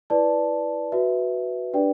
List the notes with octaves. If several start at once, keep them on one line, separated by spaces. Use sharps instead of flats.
E4 B4 D5 A5
F#4 B4 E5
D4 G4 B4 D5 G5